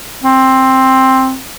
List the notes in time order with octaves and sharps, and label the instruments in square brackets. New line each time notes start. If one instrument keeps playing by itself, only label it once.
[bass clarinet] C4